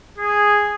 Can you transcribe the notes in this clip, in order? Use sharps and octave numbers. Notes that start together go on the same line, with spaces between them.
G#4